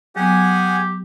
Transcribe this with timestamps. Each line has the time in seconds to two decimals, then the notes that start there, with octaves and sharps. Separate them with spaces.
0.16 F#3 B3 G4 G#4 F#5 G#5